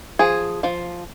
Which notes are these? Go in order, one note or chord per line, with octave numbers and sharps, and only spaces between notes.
F3 G#4
F3 F5